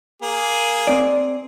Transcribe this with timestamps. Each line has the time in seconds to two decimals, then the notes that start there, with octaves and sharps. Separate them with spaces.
0.22 A#3 G#4
0.87 C4 D5